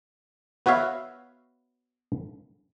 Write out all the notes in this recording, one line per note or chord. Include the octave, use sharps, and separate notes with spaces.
B3 F#4 B4 C#5 E5 F5